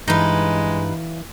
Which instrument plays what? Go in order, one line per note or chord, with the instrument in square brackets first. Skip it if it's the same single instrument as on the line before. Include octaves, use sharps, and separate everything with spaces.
[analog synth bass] G2 [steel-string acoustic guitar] E3 F5 [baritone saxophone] G#3 [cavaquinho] D#4 B4